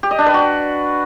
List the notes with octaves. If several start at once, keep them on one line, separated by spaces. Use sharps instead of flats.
G4
D#5
D4
B4
F#4